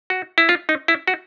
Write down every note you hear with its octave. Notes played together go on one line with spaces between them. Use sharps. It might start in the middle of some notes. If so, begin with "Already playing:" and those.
F#4
E4
F4
D#4
E4
F#4